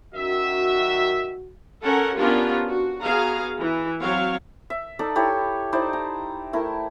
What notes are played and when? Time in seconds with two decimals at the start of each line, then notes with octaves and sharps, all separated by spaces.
0.15 F#2 D#3 F#4 E5
1.82 C#4 A4 A#4 F#5
2.17 B3 C#4 D4 F4 G4 A#4
2.69 F#4
3.03 B3 F#4 G#4 F5 A#5
3.59 E3
4.01 F#3 C4 C#5 F5
4.70 E5
4.99 D#4 A4 D5
5.16 E4 G4 A4 C#5
5.73 D#4 E4 C5 D5
5.93 A#5
6.53 A3 E4 A#4